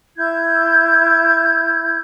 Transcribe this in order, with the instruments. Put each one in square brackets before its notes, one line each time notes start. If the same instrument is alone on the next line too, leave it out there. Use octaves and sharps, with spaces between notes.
[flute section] E4 G6 G#6